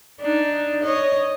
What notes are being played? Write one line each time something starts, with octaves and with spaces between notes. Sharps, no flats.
D4 D#4
C#5 D#5